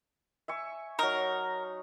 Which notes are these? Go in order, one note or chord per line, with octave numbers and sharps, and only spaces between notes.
E5 G#5 C#6
F#3 D#4 A#4